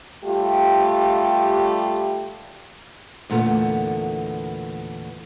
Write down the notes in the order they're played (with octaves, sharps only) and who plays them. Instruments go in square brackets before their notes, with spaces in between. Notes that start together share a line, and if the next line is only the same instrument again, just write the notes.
[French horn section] G3 A3 F4 G4
[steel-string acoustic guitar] E2 A#2 D3 A3 B3